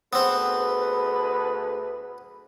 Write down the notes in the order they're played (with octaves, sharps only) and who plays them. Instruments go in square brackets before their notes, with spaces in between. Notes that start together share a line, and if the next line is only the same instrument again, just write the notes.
[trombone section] D2 G#4 B4 [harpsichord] B3 C4